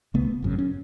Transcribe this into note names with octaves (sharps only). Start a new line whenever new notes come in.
C#2 C#3 A3 B3
G#1 F#2 C#3
C#4